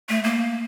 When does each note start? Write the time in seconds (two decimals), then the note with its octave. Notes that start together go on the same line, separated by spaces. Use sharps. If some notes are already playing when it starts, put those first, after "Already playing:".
0.09 A3
0.24 A#3